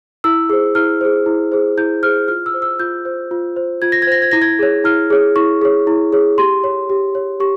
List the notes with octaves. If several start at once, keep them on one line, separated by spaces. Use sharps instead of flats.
E4 E6
G#4 C5
E4 F6
G#4 C5
E4
G#4 C5
E4 G6
G#4 C5 F6
F4 F6
E6
C5
E6
F4 G6
C5
F4
C5
F4 G#6
A#6
G#6
C5 A#6
G#6
E4 A#6
G#6
G#4 C#5
E4 F6
G#4 C#5
E4 C#6
G#4 C#5
E4
G#4 C#5
G4 C6
C#5
G4
C#5
G4 C#6